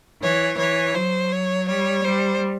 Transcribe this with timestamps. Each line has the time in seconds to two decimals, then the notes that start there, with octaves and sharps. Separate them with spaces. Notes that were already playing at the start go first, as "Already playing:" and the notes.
0.23 E3 C#5
0.58 E3 C#5
0.95 F#3 C5
1.32 C#5
1.68 G3 C#5
2.04 G3 C5